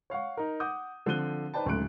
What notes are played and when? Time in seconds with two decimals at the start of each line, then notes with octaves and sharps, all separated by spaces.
0.10 C#5 F5 F#5 C#6
0.37 D#4 A#4
0.60 F#5 D6 D#6 G6
1.06 D3 F3 C4 F#6 D#7 G7
1.54 D#4 B4 C5 D5 G5 A5
1.65 D1 D2 G#2 C#3 F#6 D7